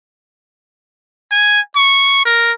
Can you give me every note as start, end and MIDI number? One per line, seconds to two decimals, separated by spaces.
1.31 1.60 80
1.76 2.21 85
2.25 2.52 70